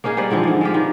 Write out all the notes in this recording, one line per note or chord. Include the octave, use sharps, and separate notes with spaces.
A#3 C#4 D#4 G#4
G3 B4 C5 D5
D3 E3 F3 C4
G#2 D3
G#3 F4 G4
D#3 B4